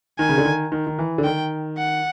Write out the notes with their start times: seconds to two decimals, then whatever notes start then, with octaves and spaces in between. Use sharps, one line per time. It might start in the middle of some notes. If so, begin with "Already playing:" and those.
0.19 D#3 G#5
0.29 C#3
0.38 D3
0.45 D#3
0.72 D#3
0.87 D#3
0.99 E3
1.18 D3
1.24 D#3 G5
1.78 F#5